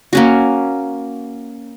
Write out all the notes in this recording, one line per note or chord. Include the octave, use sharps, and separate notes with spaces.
A#3 C#4 F#4